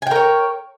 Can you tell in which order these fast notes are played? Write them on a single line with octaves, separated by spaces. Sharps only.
G#5 G5 A#4 C#5